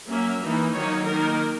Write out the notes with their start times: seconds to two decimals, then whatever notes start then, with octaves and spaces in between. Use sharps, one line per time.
0.08 F#3 A#3 C#4 E5
0.42 E3 A#3 D#4
0.75 D#3 F#3 A#3 D#4 C#5
1.09 D#3 A#3 D#4 A#4